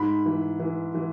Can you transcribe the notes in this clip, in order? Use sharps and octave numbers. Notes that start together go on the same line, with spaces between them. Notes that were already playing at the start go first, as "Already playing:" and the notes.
Already playing: G#2 B5
E3
E3
E3